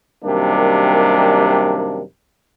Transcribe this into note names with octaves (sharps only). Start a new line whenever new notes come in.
F#2 C3 D#3 G3 A#3 D4